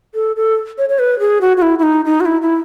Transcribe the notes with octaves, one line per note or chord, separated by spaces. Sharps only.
A4
A4
C#5
C#5
B4
G#4
F#4
F#4
E4
E4
D#4
D#4
F#4
E4
E4